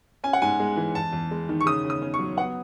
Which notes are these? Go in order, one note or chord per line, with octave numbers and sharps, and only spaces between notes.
C#4 G#5
F#5
G#2 G#5
G#3
E3
E2 A5
E2
G#3
D#3
C#6
C#3 D#6
C#3
D#6
C#4
C#6
F#3
B3 F#5